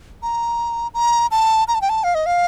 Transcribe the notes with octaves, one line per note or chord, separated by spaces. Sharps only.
A#5
A#5
A5
A#5
A5
G5
A5
F5
D#5
F5